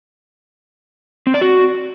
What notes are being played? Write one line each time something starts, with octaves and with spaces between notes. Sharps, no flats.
C4
D5
F#4